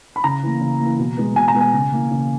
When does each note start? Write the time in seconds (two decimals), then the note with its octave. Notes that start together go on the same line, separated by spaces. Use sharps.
0.16 B5
0.24 C#3 A#5
0.43 E3 A#3
0.61 C#3
0.80 E3 A#3
0.99 B2
1.17 G#3 B3
1.36 B2 G#5
1.48 A#5
1.55 G#3 B3
1.60 G#5
1.73 C#3
1.92 E3 A#3
2.11 C#3